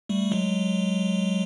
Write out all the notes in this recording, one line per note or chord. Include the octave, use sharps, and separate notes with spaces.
G3 A3
F#3 G#3